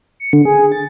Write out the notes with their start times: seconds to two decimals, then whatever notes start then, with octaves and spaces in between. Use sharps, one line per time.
0.20 C#7
0.33 D3
0.45 G#4
0.72 A6